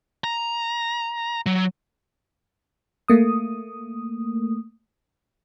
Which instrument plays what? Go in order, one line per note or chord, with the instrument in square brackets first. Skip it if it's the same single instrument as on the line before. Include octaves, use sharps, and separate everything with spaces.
[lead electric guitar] A#5
F#3
[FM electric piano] A3 A#3 D#6